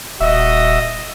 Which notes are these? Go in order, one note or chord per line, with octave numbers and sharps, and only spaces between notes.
D#1 F#4 D#5 E5